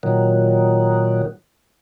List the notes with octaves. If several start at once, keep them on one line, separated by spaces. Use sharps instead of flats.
A#2 D#3 F#3